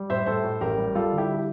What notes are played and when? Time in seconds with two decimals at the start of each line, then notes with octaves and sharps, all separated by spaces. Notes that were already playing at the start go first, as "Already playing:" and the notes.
Already playing: G3
0.10 A2 C5 E5
0.26 A2 A4 C5
0.44 A2
0.61 A1 G4 A#4
0.78 G3
0.95 G3 F4 A4
1.12 D3
1.18 E4 G4
1.34 G4